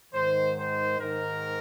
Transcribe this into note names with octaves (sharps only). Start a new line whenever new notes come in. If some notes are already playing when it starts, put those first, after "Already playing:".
G#2 D#3 C5
C5
G#2 D#3 A#4